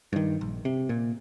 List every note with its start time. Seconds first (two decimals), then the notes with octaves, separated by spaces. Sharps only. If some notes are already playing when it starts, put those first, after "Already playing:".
0.13 G2 D#3
0.41 A#1
0.65 C3
0.89 A#2